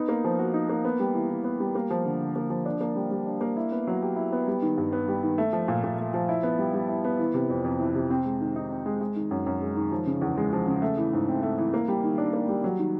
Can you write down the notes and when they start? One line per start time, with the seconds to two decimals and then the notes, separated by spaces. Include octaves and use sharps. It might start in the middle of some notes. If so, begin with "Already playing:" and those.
Already playing: B3 D#4
0.09 A#3
0.24 F3
0.39 F#4
0.54 D#4
0.69 A#3
0.85 B3
1.00 G3
1.14 E3
1.30 E3
1.44 B3
1.60 G3
1.75 A#3
1.90 F3
2.05 D3
2.20 D3
2.36 A#3
2.50 F3
2.66 D4
2.81 A#3
2.96 G3
3.11 G3
3.27 D4
3.41 A#3
3.57 E4
3.72 B3
3.87 F#3
4.02 G4
4.16 E4
4.32 B3
4.48 G3
4.62 D#3
4.78 G2
4.93 B3
5.08 G3
5.23 D#3
5.38 A3
5.53 F3
5.68 A#2
5.84 A#2
5.99 A3
6.14 F3
6.29 E4
6.43 B3
6.59 G3
6.74 G3
6.89 E4
7.04 B3
7.19 E3
7.34 C3
7.50 F2
7.64 F2
7.80 E3
7.94 C3
8.10 C4
8.25 G#3
8.41 D#3
8.56 D#4
8.70 C4
8.86 G#3
9.01 G#3
9.16 D#3
9.31 F#2
9.46 F#2
9.62 G#3
9.76 D#3
9.92 F3
10.06 C#3
10.21 E2
10.38 G#3
10.53 F3
10.67 C#3
10.82 A3
10.98 E3
11.13 G#2
11.28 C4
11.43 A3
11.58 E3
11.74 A#3
11.88 G3
12.04 D#3
12.18 D4
12.33 A#3
12.49 G3
12.64 F#3
12.79 D#3